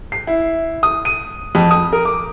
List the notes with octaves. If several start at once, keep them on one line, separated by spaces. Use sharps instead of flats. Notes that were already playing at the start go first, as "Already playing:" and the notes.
C7
E4
D#6
D#7
F2
D#6
A#4
D6